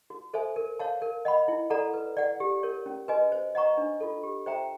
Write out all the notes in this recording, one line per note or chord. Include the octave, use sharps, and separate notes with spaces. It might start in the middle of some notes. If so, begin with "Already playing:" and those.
F#4
A4 C5 E5 G#5
A#4
C#5 F5 A5
A#4
D#5 F#5 B5
E4
A4 D5 F#5 A#5
B4
D5 F#5
G4
A#4 C#5
C#4
F#4 B4 D#5 G#5
C5
D#5 F#5 A#5 C#6
D4
F4 A4
G4
C5 E5 G5 A#5